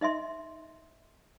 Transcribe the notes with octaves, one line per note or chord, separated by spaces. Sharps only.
D#4 D#5 E5 C6